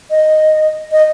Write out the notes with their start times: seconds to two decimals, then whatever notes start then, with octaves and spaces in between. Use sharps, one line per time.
0.10 D#5
0.92 D#5